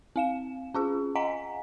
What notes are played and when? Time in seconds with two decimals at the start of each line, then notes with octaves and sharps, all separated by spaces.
0.16 C4 F5 E7
0.74 C#4 F4 G#4
1.15 D#5 F5 F#5 G#5 A#5 B6